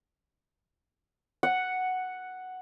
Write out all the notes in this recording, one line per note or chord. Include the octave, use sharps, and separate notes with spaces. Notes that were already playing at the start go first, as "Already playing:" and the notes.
F#5